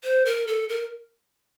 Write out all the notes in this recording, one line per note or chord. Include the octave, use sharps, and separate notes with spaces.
C5
A#4
A4
A#4